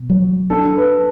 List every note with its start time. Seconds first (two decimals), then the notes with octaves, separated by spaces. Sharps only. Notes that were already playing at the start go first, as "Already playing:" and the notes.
Already playing: B2
0.10 F#3
0.50 D4 A4
0.77 B4